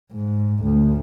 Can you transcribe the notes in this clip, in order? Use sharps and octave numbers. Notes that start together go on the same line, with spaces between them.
G#2
D2